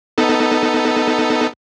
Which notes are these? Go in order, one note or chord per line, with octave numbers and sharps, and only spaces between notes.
B3 D#4 A4